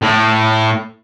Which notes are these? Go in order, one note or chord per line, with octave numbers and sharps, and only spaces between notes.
A2